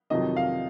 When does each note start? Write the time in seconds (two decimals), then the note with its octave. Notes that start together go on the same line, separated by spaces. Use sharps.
0.10 F2 C3 D#3 F#3 D#5
0.36 F5